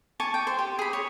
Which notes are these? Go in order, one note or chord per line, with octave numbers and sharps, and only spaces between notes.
G#5 A5 C#6 D6
G5
C5
G4
G#4 B5
C#5